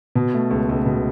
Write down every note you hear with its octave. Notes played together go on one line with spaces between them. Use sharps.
B2
A3
C#2
C#2
B2